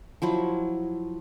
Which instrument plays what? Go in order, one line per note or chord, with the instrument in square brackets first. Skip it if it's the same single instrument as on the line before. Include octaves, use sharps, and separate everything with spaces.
[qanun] F3 F#3 E4